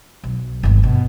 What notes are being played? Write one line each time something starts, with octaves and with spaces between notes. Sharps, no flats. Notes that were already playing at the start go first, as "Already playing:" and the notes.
B1
G1 D#2
B2